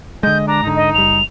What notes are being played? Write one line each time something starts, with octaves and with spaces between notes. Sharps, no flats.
D3 G#3 D#5 G6
D4 A#5
G#2 D3 D#4
D#5
F#1 G3 F7